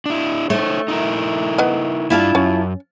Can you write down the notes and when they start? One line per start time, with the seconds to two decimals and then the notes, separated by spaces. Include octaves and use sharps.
0.06 D4 E4
0.50 A3 D#4 C5 C#5
0.88 D#4 E4 A#4
1.58 B3 D#5
2.10 G2 D4 E4 F4 A5
2.35 F#2 C#4